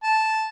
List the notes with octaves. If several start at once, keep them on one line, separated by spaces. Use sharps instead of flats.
A5